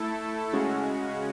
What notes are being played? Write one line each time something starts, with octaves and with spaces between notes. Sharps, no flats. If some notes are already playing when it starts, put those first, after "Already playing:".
Already playing: A3 E4 A4
C#3 G#3 C#4 F#4